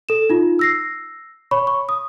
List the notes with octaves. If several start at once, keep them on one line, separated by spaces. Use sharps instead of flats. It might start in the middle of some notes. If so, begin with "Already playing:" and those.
A4 E7
D#4 F4
E6 A#6 C7
C#5 B5 C#6
C#6
D#6